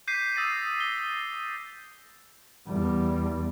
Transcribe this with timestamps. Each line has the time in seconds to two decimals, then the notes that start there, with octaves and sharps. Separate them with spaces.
0.07 D6 G6 B6 C7 D#7
0.36 D#6 E6 G6 A6 A#6 C7
0.77 B6 G7
2.67 E2 G3